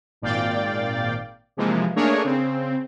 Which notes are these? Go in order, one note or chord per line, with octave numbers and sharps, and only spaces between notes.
G#1 A#2 D5 F5 G5 A6
C3 E3 F3 G#3 A#3
A3 A#3 D4 G#4 A#4 C#5
C#3 C4